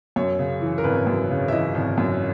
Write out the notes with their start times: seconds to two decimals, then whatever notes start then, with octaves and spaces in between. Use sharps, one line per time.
0.16 F#2 C#5
0.39 C#3
0.61 E3
0.78 A#4
0.84 G#1 B4
1.07 F#2
1.30 C#3
1.48 E5
1.52 E3 D#5
1.75 G#1
1.98 F#2